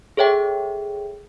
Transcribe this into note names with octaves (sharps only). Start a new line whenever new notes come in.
G#4 A4 C#5 E5 G5